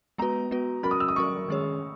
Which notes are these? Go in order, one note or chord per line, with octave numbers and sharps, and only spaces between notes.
G#3 B3 F#4 B4 A#5
G#3 B3 F#4 B4
F#3 C#4 F#4 A#4 B5
D#6
E6
D#6
F#3 C#4 F#4 A#4 C#6
D#3 G#3 C#4 G#4 C#5